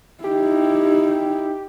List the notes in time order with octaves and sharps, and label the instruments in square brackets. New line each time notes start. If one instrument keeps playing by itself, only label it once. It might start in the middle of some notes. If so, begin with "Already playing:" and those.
[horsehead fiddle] D#4 E4 [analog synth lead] G4